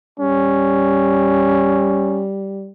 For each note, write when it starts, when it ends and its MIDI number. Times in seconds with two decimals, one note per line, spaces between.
0.20 2.71 55
0.20 2.25 61